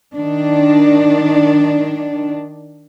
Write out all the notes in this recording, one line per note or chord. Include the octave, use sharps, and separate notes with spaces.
D#3 D4